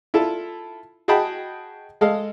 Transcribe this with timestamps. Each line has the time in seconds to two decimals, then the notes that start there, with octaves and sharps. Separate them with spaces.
0.14 E4 F4 A4 A5
1.08 F#4 G#4 D#5 G5 A5 B5
2.01 G#3 A4 D#5 F5